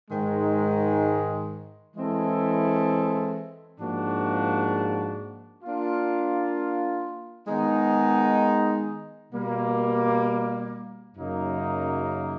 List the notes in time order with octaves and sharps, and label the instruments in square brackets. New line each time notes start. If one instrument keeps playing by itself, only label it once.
[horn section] G#2 D#3 G#3
E3 G#3 C4 E4 A4
G#2 F3 A#3 D4 F#4
A#3 D4 F4
D#3 G#3 B3 D#4
B2 G3 A#3
F#2 C#3 F#3 A#3 D#4